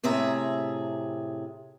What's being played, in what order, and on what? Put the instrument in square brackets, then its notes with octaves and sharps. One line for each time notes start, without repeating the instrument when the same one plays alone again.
[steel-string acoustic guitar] A2 C3 G#4 E5 A#5